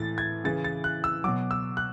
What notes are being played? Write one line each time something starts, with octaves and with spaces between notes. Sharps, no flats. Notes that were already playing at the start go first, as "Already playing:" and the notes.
Already playing: A2 E3 A6
G#6
C#3 E3 A6
A6
F#6
E6
B2 F#3 D6
E6
F#6